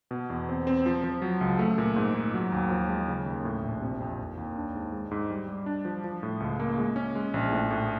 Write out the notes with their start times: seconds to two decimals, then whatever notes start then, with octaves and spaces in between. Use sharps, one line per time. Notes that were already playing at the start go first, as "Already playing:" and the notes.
0.11 B2
0.30 E2
0.49 C4
0.67 C4
0.86 F3
1.04 F3
1.22 F#3
1.41 C#2
1.59 A3
1.78 A#2
1.96 G#2
2.14 G#2
2.34 F#3
2.52 D#2
2.71 F3
2.88 G#3
3.08 C#3
3.26 D#2
3.45 A2
3.63 A#1
3.81 C3
4.00 F2
4.18 D#2
4.37 D#2
4.56 D4
4.75 G#2
4.92 G#3
5.11 G#2
5.30 G3
5.49 G3
5.66 D4
5.85 F3
6.04 F3
6.23 A2
6.40 C#2
6.60 A#3
6.78 G#3
6.96 C#4
7.15 G#3
7.34 A#1
7.52 A2
7.71 A2